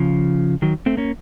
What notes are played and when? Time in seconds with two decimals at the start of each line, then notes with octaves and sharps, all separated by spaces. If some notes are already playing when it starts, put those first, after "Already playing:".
Already playing: C#3 F3
0.62 D#3 F#3
0.86 A3 C4
0.97 A#3 C#4